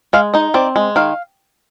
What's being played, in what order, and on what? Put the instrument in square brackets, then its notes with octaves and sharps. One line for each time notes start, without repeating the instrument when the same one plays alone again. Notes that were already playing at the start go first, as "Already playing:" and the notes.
[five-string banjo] G#3 F5
D#4 D#5
C4 D5
G#3
D#3 F5